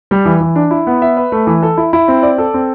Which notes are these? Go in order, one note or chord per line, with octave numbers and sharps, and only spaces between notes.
G3
E3
E3
D4
E4
B3
E5
B4
A3
E3
A4
E4
E4
C4
D5
A4
C4